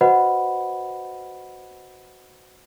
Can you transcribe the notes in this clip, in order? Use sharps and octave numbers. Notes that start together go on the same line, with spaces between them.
F#4 B4 C5 D#5 F#5 B5